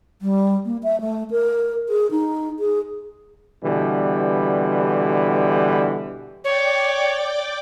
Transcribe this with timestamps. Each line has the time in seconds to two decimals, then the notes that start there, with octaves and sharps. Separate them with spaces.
0.22 G3
0.65 A#3
0.83 E5
1.01 A3
1.31 A#4
1.89 G#4
2.11 D#4
2.60 G#4
3.64 B2 D3 E3 G3
6.44 C#5 D5 G5 D6